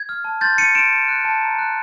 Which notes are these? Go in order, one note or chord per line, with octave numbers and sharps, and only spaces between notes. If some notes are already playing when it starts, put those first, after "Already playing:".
Already playing: G#6
F6
A5
C6 G6 A6
G6 C#7 D#7
C6 D7 E7
A5
F#6
A5
A#5
F#6